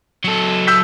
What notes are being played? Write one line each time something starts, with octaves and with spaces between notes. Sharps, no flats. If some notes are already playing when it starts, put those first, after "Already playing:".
F#3 A4
E6 G6 B6